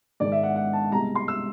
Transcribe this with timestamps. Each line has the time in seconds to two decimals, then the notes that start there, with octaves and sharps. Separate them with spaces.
0.20 G#2 D#3 G#3 D5
0.32 E5
0.43 F#5
0.56 F#5
0.73 A5
0.92 C2 B2 G#3 A#5
1.15 C6
1.28 E6